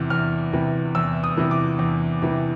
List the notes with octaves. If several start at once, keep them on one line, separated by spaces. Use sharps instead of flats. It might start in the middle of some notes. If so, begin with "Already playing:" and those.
Already playing: E2 C3 E3
E2 F6
C3 E3
E2 E6
D#6
C3 E3
D6
E2
C3 E3